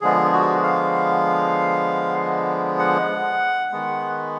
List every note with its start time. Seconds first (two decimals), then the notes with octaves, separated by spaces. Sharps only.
0.01 D3 F3 G#3 B3 G#4
0.33 F#4
0.64 F5
2.79 F#5
3.72 D#3 G#3 B3